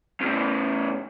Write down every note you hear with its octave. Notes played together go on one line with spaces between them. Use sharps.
E2 A2